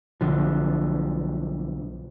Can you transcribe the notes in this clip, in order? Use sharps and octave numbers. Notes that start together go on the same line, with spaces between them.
B1 D3 F3